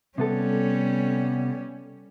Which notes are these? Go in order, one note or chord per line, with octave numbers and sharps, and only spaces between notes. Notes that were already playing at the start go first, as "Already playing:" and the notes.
C3 G3 B3 C#4 A4